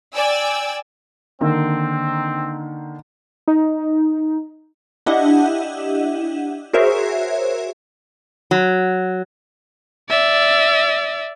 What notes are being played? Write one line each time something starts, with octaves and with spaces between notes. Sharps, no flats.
D5 G5 G#5 E6
D3 D#3 A#3 C4
D#4
D4 E4 G4 D#5 E5 F#5
F#4 G#4 A#4 C5 C#5 E5
F#3
D5 E5